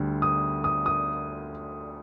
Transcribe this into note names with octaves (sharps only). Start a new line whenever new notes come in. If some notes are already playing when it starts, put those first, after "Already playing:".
Already playing: D2 D3 G3
D#6
D#6
D#6